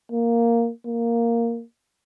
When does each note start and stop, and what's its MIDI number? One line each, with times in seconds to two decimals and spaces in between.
0.12 0.71 58
0.86 1.63 58